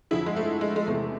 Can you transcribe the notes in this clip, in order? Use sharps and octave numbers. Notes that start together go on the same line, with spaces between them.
F2 D3 F3 E4 G#4
G#3
A3
G#3
G#3
E2 C3 E3 A3